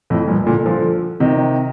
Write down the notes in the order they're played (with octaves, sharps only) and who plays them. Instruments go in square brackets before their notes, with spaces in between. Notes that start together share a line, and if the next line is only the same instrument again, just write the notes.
[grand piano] F2 A2
G2 A#2
A#2 D3
D3 F3
C3 D#3